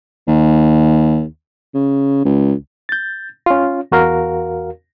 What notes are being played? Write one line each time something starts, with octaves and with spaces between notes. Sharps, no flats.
D#2
C#3
C#2
G6 A6
C#4 F4
E2 F#4 A#4 F5